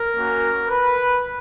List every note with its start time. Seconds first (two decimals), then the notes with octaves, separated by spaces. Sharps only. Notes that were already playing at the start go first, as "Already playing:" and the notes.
Already playing: A#4
0.16 A#3 C#4 F#4
0.68 B4